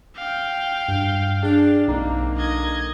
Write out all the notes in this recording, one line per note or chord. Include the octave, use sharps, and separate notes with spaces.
F5 G5
G2
D4 G#4
B1 D3 A#3 C4 D#4 A#5
D#5 G#6